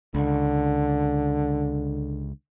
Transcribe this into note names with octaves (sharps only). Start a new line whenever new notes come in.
C#2 D3